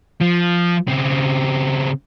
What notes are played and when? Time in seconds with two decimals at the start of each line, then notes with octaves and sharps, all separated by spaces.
0.20 F3
0.88 C#3 C4